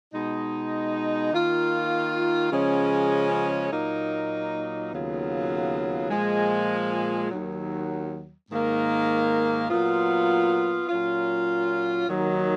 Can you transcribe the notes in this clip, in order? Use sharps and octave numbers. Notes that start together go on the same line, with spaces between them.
B2 G#3 D#4
D#3 A#3 F4
C#3 F3 G#3 C#4
A#2 F#3 A#3 D#4
D#2 C#3 F#3 B3 F4
A#2 F3 G#3
D#2 D#3 F#3
G#2 D#3 A#3
A#2 F#3 B3 F4
A#2 F#3 C#4 F4
D#2 D#3 F#3